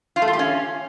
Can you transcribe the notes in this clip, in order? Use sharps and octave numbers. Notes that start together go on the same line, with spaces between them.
F4
A3
F4
G4
C#4